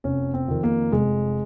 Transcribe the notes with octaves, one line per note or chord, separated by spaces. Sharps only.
F1 C#4
C4
F2 D#3
A#3
F1 G#3